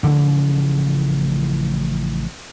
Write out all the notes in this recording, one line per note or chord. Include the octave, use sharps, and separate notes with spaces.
A1 C#3 F3 A3